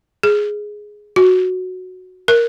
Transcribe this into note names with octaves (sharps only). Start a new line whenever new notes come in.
G#4
F#4
A#4